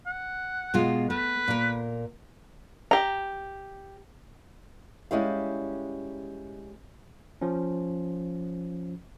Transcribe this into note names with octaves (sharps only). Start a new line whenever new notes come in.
F#5
B2 G#3 F4
A3 B4
A#2 A#4
G4 A#5
G3 G#3 C#4 E4 G4 F5
F3 C#4